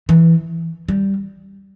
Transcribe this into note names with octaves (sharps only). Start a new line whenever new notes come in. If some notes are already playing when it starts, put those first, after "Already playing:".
E3
G3